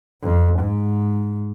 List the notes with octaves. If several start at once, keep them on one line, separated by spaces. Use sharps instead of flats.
F2
G#2